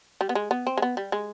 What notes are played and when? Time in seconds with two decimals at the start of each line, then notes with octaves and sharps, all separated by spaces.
0.21 G3
0.29 B3
0.35 G#3
0.51 B3
0.67 C4
0.77 G#3
0.82 B3
0.97 G3
1.12 G#3